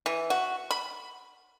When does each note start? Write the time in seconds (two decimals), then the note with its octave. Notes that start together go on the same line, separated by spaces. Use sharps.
0.06 E3
0.30 F#4
0.71 B5